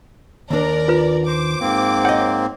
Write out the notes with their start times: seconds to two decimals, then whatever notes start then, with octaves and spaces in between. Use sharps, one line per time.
0.50 D#2 D4 A#4 D5
0.88 F4 B4
1.26 C5 D6
1.60 G#2 A#3 C4
2.05 C#5 D#5 F#5